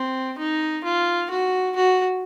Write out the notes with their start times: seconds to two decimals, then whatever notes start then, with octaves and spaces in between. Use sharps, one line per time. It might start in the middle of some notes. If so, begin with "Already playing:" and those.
Already playing: C4
0.39 D#4
0.84 F4
1.31 F#4
1.76 F#4